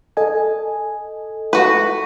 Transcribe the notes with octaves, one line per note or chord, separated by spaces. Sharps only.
A4 D#5 G#5
F#4 B4